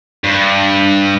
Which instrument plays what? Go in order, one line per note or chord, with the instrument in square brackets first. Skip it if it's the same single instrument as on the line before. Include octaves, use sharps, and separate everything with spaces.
[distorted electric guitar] G2